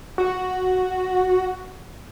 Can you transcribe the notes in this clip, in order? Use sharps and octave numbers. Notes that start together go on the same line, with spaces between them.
F#4